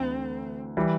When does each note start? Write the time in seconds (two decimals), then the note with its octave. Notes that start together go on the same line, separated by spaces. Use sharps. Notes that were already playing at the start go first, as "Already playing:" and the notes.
Already playing: D2 E3 C4
0.77 E3 G3